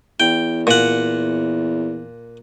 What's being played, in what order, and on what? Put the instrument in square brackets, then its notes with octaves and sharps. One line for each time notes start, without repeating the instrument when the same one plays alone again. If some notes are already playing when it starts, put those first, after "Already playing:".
[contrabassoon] E2 [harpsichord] G5
[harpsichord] A#2 F#5